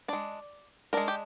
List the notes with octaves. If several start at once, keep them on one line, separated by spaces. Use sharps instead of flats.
G#3 D4 D5
G#3 D4 A#4
G4